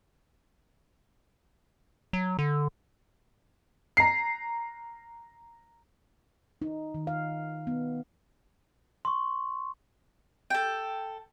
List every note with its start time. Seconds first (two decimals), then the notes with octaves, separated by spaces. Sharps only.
2.13 F#3
2.39 D3
3.97 A#5 C7
6.62 D#4
6.94 D#3
7.07 F5
7.67 B3
9.05 C6 C#6
10.50 A4 G5